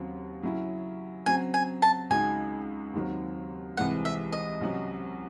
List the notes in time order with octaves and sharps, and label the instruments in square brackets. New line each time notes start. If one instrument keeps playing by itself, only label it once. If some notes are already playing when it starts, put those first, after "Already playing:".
Already playing: [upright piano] D#2 C#3 F#3 C4 F#4
C#3 F#3 C#4 E4
[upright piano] C#3 F#3 C4 [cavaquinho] G#5
[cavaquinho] G#5
A5
[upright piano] C#2 C#3 G#3 D#4 F#4 [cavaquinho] G#5
[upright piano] D#2 D#3 F#3 C4
[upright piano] C2 C3 E3 G#3 C4 [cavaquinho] F#5
[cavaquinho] E5
D#5
[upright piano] C2 C3 F#3 C#4 F#4